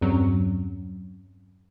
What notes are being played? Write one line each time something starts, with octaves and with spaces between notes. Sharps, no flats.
E2 G2 F#3 C4 C#4